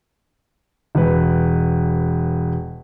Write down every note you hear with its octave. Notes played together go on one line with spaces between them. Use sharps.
E1 B4